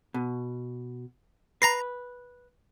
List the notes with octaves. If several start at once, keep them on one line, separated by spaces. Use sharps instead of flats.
B2
B4 A#5 A#6 C7